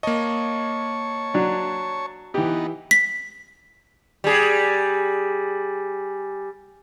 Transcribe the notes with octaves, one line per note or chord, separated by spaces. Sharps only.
A#3 C#5 D#5 A5 C#6
F#3 D4
E3 B3 D#4 G4
B6
G3 G#4